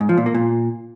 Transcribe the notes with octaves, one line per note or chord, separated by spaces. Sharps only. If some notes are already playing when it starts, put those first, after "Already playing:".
G#2
F3
A#2
A#3
A#2